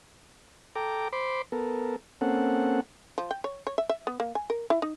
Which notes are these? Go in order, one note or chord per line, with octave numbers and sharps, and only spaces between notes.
A4 G5 A#5 D6
C5 B5 C6 D6
B3 A4 A#4
A#3 C4 C#4 A4 F#5
F3
G5
C#5
C#5
E5
E5
B3
A#3
G#5
A#4
E4
D#4